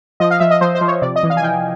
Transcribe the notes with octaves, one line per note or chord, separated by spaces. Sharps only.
F3 D#5
F5
F3 E5
D#5
F3 C5
C5
F3
C#5
C3 D5
D#5
E3
F5
G#5
E3 G5